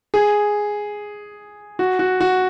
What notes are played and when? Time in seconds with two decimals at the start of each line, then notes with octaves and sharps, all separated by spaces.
0.14 G#4
1.79 F#4
1.99 F#4
2.21 F#4